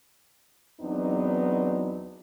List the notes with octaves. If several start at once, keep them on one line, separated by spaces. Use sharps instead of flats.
E2 F#3 B3 C4 D4 D#4